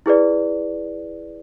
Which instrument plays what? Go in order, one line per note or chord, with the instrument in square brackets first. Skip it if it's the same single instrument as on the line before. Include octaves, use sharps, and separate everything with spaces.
[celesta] E4 G#4 B4 D5